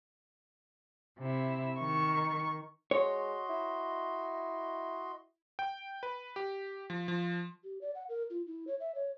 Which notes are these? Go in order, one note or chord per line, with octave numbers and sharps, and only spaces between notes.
C3 E4
D#3 C#6
G#3 F#4 C#5 D#5 C6
E4
G5
B4
G4
F3
F3
G4
D5
F#5
A#4
F4
E4
C#5
E5
C#5